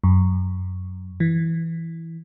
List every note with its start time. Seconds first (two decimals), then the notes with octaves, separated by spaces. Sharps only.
0.04 F#2
1.20 E3